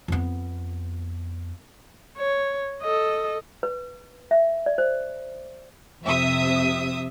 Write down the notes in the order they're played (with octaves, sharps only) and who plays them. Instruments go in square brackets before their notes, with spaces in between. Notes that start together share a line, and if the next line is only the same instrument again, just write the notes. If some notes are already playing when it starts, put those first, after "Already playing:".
[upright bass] F2 B3
[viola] C#5
A4 D#5
[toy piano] B4
E5
D5
C5
[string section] F2 C3 E5 D#6